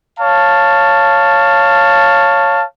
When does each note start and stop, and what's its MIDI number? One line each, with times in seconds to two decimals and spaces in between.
0.19 2.63 73
0.19 2.63 77
0.19 2.63 81